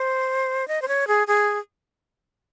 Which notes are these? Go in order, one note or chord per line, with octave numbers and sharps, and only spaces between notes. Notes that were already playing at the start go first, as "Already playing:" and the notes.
Already playing: C5
D#5
C5
C#5
G#4
G#4